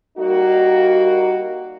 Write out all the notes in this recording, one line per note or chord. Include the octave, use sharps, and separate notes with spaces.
G3 A#3 D#4 F#4